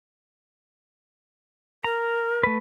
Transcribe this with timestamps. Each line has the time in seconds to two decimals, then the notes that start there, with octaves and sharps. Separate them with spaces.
1.84 A#4 A#5
2.43 A3 B4